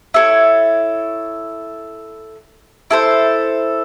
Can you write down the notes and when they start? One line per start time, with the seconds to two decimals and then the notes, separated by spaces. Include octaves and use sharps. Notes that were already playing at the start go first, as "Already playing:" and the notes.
0.14 E4 A4 C#5
2.91 E4 A4 C5